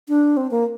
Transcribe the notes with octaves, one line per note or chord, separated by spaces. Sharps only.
D4
C4
A#3